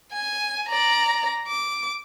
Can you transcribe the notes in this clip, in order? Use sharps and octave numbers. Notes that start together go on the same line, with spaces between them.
G#5
D5 A#5
D6